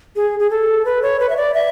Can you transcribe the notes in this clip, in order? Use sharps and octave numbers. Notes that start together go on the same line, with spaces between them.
G#4
G#4
A4
B4
C#5
B4
E5
D5
E5